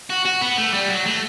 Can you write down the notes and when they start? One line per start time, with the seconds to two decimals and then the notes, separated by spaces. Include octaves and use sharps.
0.10 F#4
0.25 F#4
0.42 B3
0.58 A3
0.74 G3
0.89 F#3
1.06 A3